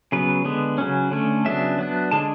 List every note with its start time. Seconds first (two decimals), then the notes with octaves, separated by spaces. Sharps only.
0.12 C#3 F#3 B3 B4
0.45 D3 G#3 B3
0.78 C#3 F#3 C#4
1.11 D3 A3 C#4
1.45 C#3 F#3 B3 D4 E5
1.78 F#3 B3 D4
2.11 D3 G#3 D4 A5